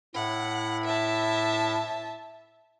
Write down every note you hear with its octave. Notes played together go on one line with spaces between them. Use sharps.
A2 E4 F#5
E5 A5